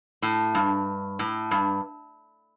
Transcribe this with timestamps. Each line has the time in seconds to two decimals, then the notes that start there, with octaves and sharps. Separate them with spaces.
0.22 A2
0.55 G2
1.19 A2
1.51 G2